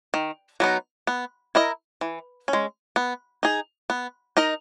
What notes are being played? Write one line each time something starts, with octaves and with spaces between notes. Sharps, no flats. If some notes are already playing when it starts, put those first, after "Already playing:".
D#3
F#3 B3 D#4
B3
E4 A#4 D#5
E3
C#4
G#3
B3
D#4 G#4
B3
D#4 A#4 D#5